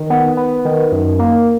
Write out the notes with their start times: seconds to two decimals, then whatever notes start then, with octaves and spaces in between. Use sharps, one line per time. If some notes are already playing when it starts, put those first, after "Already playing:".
Already playing: D#3
0.10 B3
0.37 B3
0.65 D#3
0.92 F#2
1.19 A#3